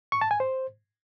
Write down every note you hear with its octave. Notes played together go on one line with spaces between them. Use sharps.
C#6
A5
G#5
C5